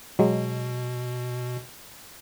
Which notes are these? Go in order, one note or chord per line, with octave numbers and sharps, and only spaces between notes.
B2 F#3 G#3